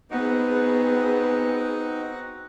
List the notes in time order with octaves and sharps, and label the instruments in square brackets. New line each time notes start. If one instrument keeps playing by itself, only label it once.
[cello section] B3 G#4 [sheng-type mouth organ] C4 F#4 F#5 [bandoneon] D#4